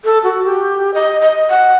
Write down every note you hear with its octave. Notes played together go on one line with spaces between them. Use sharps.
A4
F#4
G4
D#5
D#5
F#5